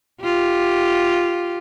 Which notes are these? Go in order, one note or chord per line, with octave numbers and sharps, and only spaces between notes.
F4 G4